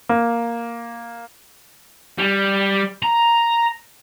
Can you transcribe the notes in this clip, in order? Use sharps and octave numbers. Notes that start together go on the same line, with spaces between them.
A#3
G3
A#5